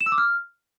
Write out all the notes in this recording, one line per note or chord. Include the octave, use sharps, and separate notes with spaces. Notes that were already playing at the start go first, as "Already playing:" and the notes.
E7
E6
D6
F6